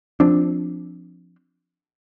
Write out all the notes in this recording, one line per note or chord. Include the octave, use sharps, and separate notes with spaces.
F3 C4 D4